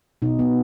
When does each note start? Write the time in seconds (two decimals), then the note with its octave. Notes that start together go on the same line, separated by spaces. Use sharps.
0.22 B2 D#4
0.39 B3